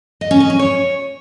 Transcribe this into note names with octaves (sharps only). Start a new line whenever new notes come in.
D#5
C#4
D#5
C#4
C#5